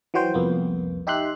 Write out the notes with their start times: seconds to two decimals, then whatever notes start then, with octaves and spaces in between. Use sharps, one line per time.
0.14 E3 F#3 F#4 C5 G5
0.34 C2 F2 A#3 B3
1.07 D#4 G4 E5 C6 F#6